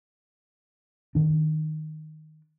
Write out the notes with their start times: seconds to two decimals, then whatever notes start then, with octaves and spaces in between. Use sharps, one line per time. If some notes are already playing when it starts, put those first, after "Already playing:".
1.15 D#3 D4